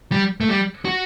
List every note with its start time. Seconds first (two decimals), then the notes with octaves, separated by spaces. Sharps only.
0.12 G3
0.41 A3
0.49 G3
0.85 F#4